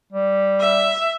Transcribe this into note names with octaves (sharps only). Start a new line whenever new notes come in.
G3
E5